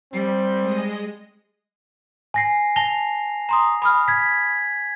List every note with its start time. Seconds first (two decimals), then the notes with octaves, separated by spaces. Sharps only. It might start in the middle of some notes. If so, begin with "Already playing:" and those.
0.12 G3 C4
0.61 G#3 D#5
2.34 G#5 A#6 C7
2.76 A5 A#6 F7 G7
3.49 A#5 C6 D#6
3.82 B5 D#6 F6
4.08 G#6 B6